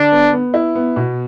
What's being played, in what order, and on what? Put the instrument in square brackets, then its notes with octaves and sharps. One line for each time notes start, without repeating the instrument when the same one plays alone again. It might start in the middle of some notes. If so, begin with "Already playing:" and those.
Already playing: [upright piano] D3 [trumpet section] D4
[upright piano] B3
B3
E4
B3
B2